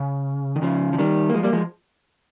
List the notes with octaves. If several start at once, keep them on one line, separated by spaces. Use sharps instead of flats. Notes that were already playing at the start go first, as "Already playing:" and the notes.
Already playing: C#3
D#3
C#3 F3
F3
D#3 G3
A#3
F3 G#3
G3 A#3
F3 G#3